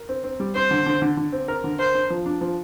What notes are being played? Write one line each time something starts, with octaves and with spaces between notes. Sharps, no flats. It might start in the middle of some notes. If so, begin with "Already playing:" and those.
Already playing: A#4
C4
C4
G3
C4 C5
D3
D3
D3
D3
C4
A#4
D3
A#4 C5
D4
F3
D4
F3